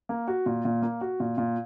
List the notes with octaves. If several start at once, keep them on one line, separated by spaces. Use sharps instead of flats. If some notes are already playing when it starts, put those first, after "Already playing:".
A#3
F#4
A#2
A#2
A#3
F#4
A#2
A#2